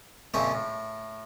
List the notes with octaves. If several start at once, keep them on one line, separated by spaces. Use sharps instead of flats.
F2 A#2 C#3 F3 C#4 E5
A2